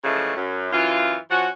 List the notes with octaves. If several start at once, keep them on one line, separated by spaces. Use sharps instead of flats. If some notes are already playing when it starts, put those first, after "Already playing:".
C#3 E3 F3 G#3 A3
F#2
F#2 E3 F4
F3 C#4 F#4